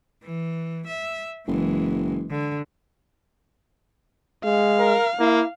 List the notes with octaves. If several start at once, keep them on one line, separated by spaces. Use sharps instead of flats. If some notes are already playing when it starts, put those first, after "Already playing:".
E3
E5
F#1 E3 G#3
D3
G#3 F5
A#4
A#3 E4